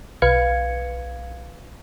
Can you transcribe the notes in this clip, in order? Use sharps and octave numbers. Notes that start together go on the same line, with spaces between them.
B1 B4 F5 G#6 C#7